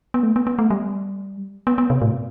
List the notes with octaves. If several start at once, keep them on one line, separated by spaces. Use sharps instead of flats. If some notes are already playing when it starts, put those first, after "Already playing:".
B3
A3
B3
B3
A3
G3
B3
B3
C3
A2